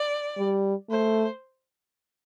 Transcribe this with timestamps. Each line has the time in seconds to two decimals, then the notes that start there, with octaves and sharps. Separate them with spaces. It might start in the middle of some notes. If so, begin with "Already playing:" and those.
Already playing: D5
0.38 G3
0.90 A3 C5